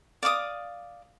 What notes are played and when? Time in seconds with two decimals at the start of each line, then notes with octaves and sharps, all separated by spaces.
0.23 D5 F5 D6 D#6